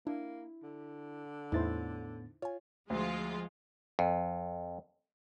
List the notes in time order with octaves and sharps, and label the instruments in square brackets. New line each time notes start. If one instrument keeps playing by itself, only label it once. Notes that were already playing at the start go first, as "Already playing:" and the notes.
[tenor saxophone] A#3 [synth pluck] D4 [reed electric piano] E4
[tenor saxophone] D3
[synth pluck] E2 [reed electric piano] A2 B3 A6 [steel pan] D#4 E4 C5
[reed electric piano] F4 [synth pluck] C#5 G#5
[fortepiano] D2 [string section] F3 G#3 F4
[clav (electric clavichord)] F2